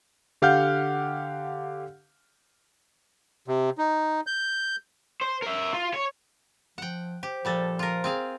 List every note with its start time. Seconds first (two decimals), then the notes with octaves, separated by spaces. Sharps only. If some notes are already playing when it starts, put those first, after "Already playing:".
0.42 D3 G4 F5 F#5 F6 G6
3.48 C3
3.78 D#4
4.27 G6
5.21 C5
5.42 A#4 E5
5.73 F4
5.94 C#5
6.78 F3 F#5 G5
7.23 G4 C5
7.45 A#2 F3 G3 A4
7.79 F4 A#4
8.04 C4 G#4 F5